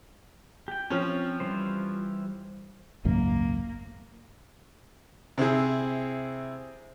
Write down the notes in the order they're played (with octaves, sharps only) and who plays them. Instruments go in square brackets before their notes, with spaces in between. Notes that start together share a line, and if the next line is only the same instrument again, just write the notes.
[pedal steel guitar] G4 G5
[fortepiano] F3 C#4 [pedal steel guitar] C4
[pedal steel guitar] E3 G3 C5
[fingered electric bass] G#1 C#2 F#2 [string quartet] A#3
[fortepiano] C3 C4 E4 G#4